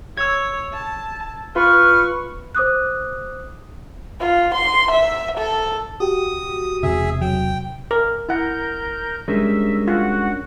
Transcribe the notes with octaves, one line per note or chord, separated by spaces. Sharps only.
C#5 E6 G#6
A5
F4 B4 C#6 F6
C5 D6 D#6 F#6
F4
C6
E5
A4
F#4 G4 D#6
E1 C3 G#4 E5
F#3 G5
A#4
E4 A#4 F#5 G6
G3 G#3 C#4 D4 A#4 E5
F4 F#4 F#5